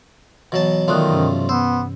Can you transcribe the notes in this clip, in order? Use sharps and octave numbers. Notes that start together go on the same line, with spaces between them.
B2 E3 F#3 A5
B1 D#3 F3 A3 D5 D#6 F#6
G2 C3 C#4
B3 C5 E6